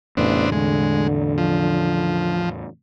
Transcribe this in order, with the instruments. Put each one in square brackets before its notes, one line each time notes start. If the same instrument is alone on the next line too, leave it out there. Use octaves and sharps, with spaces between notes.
[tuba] A1 [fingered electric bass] E2 A2 C3 [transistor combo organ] B3 C4 D4
[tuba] D3 [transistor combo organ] G#3
[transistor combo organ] F3